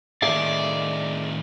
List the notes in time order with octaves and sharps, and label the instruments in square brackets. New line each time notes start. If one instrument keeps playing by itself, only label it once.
[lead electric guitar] A2 D#3 [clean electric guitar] G#4 E5 F5 [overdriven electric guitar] D5